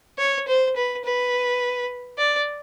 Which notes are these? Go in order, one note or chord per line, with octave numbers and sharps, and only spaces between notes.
C#5
C5
B4
B4
D5